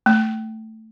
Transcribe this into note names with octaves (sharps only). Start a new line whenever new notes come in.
A3